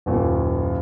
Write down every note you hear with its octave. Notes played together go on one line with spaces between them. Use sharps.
F#1 D#2 A#2